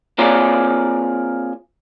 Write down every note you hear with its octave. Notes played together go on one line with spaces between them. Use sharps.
A#3 C4 F4 G#4 C#5 D5